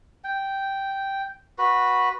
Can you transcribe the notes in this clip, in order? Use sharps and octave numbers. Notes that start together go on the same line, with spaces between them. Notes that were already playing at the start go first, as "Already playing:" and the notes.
G5
F#4 B4